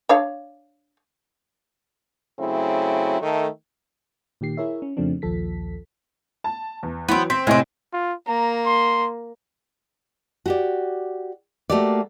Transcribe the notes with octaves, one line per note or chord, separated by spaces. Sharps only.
D4 C#5 F5
C#3 F#3 A3 C4 E4
D#3 A3
A#2 D#3 G4 C7
E4 G#4 A#4 C#5 E5
C#4
F2 C#3 F3 A3 C4 D4
A#1 D#2 F3 A4 B6
A5
E2
E3 F#3 B3 C4
C4 B6
A2 C3 G#3 C4 D#5
F4
A#3 A#5
C6
F#4 G4 D5
A3 A#3 F#4 G4 D5